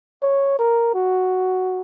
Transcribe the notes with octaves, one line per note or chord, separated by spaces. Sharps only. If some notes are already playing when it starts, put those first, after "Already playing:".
C#5
A#4
F#4